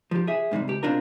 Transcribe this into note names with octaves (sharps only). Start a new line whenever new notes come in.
F3 G4
G#4 E5
G#2 C3 D#3 G3
C#2 G4
B2 C4 D4 F4 A#4